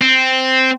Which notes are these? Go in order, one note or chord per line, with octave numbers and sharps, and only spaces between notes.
C4